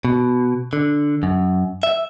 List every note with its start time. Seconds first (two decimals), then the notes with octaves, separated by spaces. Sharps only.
0.05 B2
0.73 D3
1.23 F#2
1.83 E5